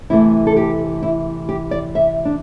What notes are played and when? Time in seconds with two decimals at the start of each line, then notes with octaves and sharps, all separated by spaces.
0.10 C3 E3 A3 E4
0.47 A4
0.57 G4
1.03 E4
1.49 G4
1.71 D5
1.95 E5
2.25 D4